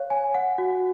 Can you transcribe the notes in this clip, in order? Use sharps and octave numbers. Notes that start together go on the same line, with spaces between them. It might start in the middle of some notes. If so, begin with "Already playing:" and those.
Already playing: C#5 F5
G#5
F#5
F#4